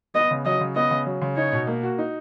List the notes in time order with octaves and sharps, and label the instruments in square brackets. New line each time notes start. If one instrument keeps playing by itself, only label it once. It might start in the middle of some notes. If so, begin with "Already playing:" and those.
[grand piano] B3 [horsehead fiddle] D#5
[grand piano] C#3
[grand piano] F#3 [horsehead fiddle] D#5
[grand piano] C#3
[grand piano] B3 [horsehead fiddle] D#5
[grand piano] C#3
F#3
C#3
[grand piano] D#4 [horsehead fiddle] C#5
[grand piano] B2
A#3
F#4
D#4